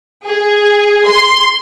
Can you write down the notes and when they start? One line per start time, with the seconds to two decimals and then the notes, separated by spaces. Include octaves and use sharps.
0.24 G#4
1.06 C6